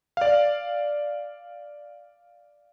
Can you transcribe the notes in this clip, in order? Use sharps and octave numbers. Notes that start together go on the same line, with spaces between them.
D5 F5